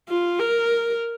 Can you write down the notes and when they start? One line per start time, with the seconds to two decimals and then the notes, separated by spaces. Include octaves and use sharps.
0.09 F4
0.40 A#4